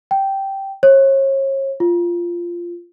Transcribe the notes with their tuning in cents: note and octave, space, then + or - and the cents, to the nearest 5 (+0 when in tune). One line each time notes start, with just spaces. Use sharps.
G5 -10
C#5 -35
F4 -10